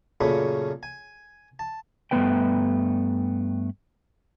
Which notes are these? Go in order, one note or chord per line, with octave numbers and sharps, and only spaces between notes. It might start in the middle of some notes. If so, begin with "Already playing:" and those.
F#2 A#2 C#3 A3 C#4 B5
G#5
A5
G2 A3 B3 B4 G5